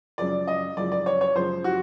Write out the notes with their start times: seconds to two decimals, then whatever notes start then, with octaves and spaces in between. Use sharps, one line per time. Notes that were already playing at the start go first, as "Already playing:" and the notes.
0.18 F#2 C#3 F3 G#3 D5
0.48 D#5
0.77 F#2 C#3 F3 G#3 D5
0.92 D5
1.06 C#5
1.21 C#5
1.35 F#2 C#3 F3 G#3 C5
1.64 F#4